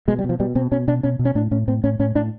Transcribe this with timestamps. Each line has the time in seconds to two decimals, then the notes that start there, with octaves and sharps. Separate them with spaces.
0.08 B2 G#3
0.19 G3
0.24 B2
0.29 F3
0.40 B2 G3
0.55 B2 C4
0.71 B2 C#4
0.88 B2 D4
1.03 B2 C#4
1.19 B2
1.25 C#4
1.35 A2 D4
1.51 A2 C#4
1.68 A2 C4
1.84 A2 C#4
1.99 A2 C#4
2.15 A2 D4